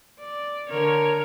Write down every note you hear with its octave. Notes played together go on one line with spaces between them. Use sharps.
D5
D3 A#4 C#5